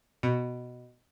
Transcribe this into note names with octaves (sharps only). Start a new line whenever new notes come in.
B2